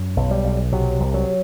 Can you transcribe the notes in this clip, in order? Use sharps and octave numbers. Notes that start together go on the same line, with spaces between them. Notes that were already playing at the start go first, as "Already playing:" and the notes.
Already playing: F#2
B1
G3
B1
C3 F#3
C2
F#3